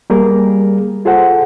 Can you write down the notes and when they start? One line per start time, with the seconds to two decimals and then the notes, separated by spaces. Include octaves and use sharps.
0.10 G3 A#3 G#4 A#4
1.05 F4 G#4 A4 C5 F#5